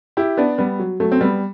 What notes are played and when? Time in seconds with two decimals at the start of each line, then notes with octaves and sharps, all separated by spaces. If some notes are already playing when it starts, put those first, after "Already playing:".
0.17 E4 G4
0.37 B3 D4
0.58 G3 B3
0.79 F#3
1.00 F#3 A3
1.12 C4
1.21 G3 B3